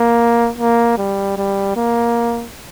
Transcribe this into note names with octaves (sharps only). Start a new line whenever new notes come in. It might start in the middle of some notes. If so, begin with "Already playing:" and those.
Already playing: A#3
A#3
G3
G3
A#3